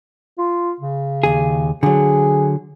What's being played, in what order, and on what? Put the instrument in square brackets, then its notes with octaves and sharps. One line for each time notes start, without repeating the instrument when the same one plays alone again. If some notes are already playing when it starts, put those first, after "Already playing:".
[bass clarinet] F4
C#3
[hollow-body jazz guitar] D#2 G#4
[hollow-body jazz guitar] D3 F#3 [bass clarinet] G#4